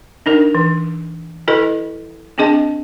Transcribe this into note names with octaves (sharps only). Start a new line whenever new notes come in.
D4 D#4 A#4
E3
E4 F#4 A4 B4 D#5
C4 D4 G#4 D#5 A5